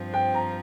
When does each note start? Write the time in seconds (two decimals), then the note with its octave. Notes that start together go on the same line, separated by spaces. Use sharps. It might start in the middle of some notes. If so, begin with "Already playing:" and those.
Already playing: G2 F3 C4
0.14 G5
0.34 A#5